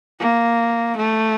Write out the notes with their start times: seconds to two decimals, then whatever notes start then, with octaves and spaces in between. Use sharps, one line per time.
0.20 A#3
0.97 A3